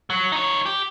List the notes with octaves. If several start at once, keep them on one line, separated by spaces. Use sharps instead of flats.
F#3
D#4 C#5
G4